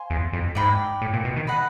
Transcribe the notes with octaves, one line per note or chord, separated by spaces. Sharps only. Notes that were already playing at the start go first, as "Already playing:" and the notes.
Already playing: C5 F5 G#5
E2
F2
G#2 D5 G5 B5
A2
A#2
B2
D#3
B4 D#5 F#5 A5